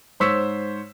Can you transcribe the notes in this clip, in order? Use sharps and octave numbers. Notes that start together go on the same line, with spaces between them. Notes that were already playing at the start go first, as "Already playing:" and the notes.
G#2 C5 C#5 C#6 E6 B6